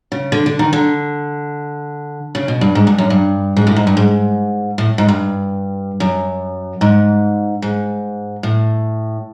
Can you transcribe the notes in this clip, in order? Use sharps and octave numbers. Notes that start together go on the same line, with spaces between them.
C#3
D3
D3
D#3
D3
C#3
B2
G2
G#2
G2
F#2
G2
G#2
A2
G#2
G2
G#2
A2
G#2
G2
F#2
G#2
G#2
A2